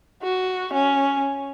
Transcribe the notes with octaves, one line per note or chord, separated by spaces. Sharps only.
F#4
C#4